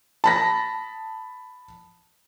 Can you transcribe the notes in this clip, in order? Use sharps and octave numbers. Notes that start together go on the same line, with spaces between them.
A5 B5 A#6